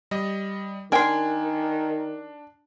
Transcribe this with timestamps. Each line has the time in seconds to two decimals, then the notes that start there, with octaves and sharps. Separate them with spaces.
0.11 G3 D#5
0.92 D#3 D4 A#4 G5 G#5 C6